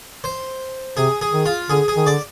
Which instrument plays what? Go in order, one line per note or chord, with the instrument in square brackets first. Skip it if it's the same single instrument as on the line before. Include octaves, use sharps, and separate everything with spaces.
[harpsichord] C5
[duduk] C3 [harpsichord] G#4
[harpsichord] G#4
[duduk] D#3
[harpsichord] F4
[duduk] D3 [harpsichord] G#4
[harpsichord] G#4
[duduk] D#3
[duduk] D3 [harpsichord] D5